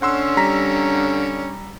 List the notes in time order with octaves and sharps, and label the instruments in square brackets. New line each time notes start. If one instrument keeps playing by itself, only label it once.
[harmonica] D3 C#4 [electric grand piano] F#5 C6 E6
[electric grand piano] G3 A#5 B6